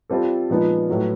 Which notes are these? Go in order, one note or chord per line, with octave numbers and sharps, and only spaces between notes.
G3 C4 F4 A4
A#2 F3 G#3 B3 D#4
A2 F#3 B3